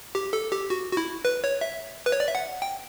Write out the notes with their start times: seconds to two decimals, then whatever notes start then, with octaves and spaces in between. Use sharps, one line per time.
0.15 G4
0.33 A4
0.52 G4
0.70 F#4
0.92 F#4
0.97 E4
1.25 B4
1.44 C#5
1.61 E5
2.06 B4
2.12 C#5
2.20 D5
2.27 E5
2.35 F#5
2.62 G5